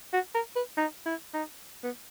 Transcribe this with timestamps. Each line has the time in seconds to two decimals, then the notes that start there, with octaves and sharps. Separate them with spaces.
0.13 F#4
0.35 A#4
0.56 B4
0.77 D#4
1.06 E4
1.34 D#4
1.83 B3